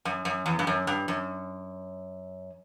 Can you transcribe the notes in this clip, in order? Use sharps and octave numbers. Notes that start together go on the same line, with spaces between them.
F#2
F#2
E2
G2
F#2
G2
F#2